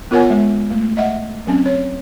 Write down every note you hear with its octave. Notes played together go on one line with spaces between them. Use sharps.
B3 F4 A#4 C#5 F#5 G#5
G#3
A3
D#5 E5 F#5
F#3 C4 C#4
C#5